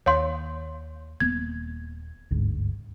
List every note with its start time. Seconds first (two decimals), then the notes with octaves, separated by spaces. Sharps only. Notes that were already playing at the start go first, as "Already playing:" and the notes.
0.06 D#2 C#5 F5 C6
1.20 D#1 A#3 B3 G#6
2.31 G1 D2 G#2